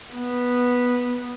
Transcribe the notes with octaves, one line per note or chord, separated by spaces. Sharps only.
B3